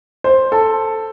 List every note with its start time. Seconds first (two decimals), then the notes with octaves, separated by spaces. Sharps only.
0.24 C5
0.52 A4